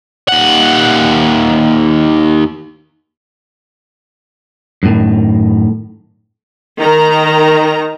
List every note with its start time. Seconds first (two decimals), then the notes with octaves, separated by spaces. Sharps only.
0.29 D#2 F#5
4.83 F#2 A2 D#3
6.80 D#3 A#5